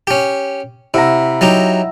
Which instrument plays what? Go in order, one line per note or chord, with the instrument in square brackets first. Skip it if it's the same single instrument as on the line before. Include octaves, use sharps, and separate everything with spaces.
[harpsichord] C#4 G4
[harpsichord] C3 [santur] E4 F#5 A#5
[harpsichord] F#3 D#4 G4